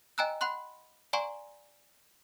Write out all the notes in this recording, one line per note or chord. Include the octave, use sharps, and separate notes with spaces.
D#5 G5 G#5 A#5 E6 F#6
F#5 B5 C6 F#6
D5 F#5 G#5 A#5 C6 C#6